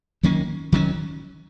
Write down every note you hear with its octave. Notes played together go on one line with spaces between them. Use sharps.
D#3 F#3 A#3 C#4
D#3 F#3 A#3 C#4